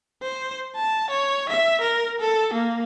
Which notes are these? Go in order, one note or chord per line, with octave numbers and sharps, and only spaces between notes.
C5
A5
C#5
E5
A#4
A4
A#3